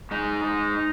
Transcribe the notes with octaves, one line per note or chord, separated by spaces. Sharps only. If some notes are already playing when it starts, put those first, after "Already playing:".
G#3 D#4
G#3